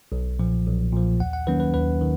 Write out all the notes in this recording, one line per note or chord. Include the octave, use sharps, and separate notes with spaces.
B1
A#2 F3
B1
A#2 F3
D#2 F#5
F#5
D#3 F#3 A#3 C#4 B4
B4
D#2 B4
D#3